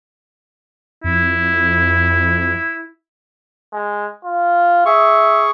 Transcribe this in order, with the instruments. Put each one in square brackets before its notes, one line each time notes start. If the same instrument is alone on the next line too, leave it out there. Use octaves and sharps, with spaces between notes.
[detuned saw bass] F2 [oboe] E4
[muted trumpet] G#3
F4
[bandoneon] G#4 C#6 [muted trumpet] E5